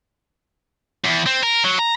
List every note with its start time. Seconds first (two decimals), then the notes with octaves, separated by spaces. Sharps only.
1.05 E2
1.27 C4
1.43 A#4
1.64 F#3
1.79 A#5